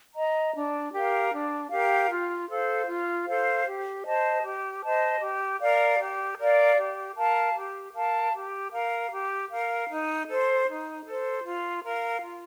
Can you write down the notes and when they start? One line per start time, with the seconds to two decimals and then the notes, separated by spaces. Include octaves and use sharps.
0.14 D#5 A#5
0.53 D4
0.93 G4 A#4 F5
1.31 D4
1.70 G4 A#4 F5
2.09 F4
2.48 A4 C5 F5
2.87 F4
3.26 A4 C5 F5
3.65 G4
4.04 C5 D#5 A5
4.43 G4
4.82 C5 D#5 A5
5.21 G4
5.60 A#4 D5 F5
5.99 G4
6.38 A#4 D5 F5
6.77 G4
7.16 A#4 F5 A5
7.55 G4
7.94 A#4 F5 A5
8.33 G4
8.72 A#4 F5
9.11 G4
9.50 A#4 F5
9.89 D#4
10.28 A4 C5
10.67 D#4
11.06 A4 C5
11.45 F4
11.84 A#4 F5
12.23 F4